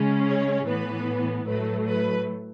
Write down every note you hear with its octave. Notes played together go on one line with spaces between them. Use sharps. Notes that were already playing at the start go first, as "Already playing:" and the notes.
Already playing: C#3 G#3 C#4
C#5
A2 E3 B3 B4
A2 F#3 A3 B4
B4